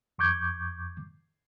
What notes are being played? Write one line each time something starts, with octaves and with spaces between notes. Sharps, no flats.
F2 C#6 D6 G6 G#6